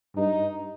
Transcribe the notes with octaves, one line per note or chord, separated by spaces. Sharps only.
G2 D#4